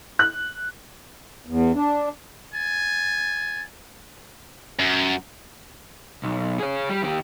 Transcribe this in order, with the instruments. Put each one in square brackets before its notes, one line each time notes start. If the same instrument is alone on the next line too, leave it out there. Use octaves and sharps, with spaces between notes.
[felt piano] F#6
[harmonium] E2
D4
[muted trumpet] G#5 [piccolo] A6
[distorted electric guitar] F#2
[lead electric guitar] B1
G#4 C#5
G3
D#2 G4